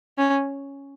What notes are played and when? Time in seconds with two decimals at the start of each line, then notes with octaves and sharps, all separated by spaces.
0.18 C#4